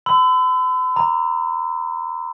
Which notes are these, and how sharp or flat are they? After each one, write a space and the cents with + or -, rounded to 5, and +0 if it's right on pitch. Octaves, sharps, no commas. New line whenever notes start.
B5 +45 E6 +0
A#5 +0 D6 -40